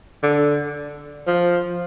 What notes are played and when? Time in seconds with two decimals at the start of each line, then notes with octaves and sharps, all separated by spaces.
0.23 D3
1.27 F3